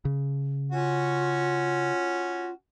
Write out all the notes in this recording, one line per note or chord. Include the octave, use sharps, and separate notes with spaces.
C#3
C#4 F4 F#4